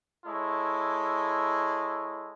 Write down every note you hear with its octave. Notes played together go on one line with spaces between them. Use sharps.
G#3 E4 A4 C#5